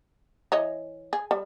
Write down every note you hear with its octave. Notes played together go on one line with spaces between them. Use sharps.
E3 C#5 D#5
G#4
G3